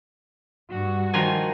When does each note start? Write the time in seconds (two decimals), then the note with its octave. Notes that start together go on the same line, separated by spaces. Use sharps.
0.70 G2 F#4
1.14 D#3 F3 G#5